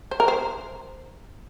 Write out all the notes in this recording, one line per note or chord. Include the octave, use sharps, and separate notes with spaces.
C5
A#4
C5